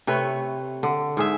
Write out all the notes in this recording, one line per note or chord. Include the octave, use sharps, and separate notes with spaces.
C3 A3 B4 C#5
D3
G#2 G#4 E5